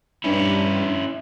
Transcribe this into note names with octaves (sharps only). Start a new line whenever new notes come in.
G2 C#4 E4